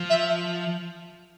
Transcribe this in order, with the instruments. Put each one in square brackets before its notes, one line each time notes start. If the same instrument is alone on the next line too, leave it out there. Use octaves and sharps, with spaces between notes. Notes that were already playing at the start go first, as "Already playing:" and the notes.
Already playing: [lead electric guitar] F3
[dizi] E5